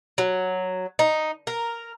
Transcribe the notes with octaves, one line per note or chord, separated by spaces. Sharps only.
F#3
D#4
A#4